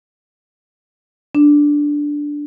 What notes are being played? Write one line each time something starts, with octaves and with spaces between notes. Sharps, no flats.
D4